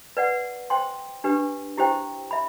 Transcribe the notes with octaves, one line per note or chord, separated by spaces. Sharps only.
B4 D5 F#5
C5 G5 C6
D4 G4 B4
E4 G4 C5 G5
E5 B5